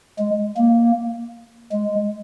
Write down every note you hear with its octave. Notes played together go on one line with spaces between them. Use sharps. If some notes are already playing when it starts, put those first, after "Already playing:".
G#3
A#3
G#3